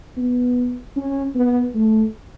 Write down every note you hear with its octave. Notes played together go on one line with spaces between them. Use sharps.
B3
C#4
B3
A3